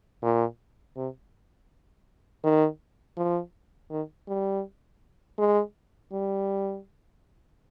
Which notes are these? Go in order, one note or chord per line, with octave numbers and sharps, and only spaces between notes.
A#2
C3
D#3
F3
D#3
G3
G#3
G3